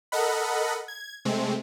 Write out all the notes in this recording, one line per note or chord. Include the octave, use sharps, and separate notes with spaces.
A4 A#4 D#5 F#5 B5
G#6
C3 G#3 A3 C4